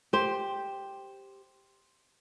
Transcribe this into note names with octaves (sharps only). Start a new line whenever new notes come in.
G4 C5